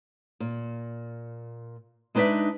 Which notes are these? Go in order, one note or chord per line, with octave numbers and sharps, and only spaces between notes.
A#2
G#3 D4 D#4 B4 D5 E5